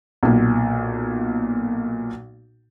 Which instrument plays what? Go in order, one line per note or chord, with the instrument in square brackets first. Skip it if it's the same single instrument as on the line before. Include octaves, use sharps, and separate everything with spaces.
[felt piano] B1 A#2